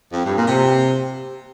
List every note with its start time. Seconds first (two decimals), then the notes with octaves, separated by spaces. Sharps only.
0.13 F2
0.25 G2
0.37 A#2
0.48 C3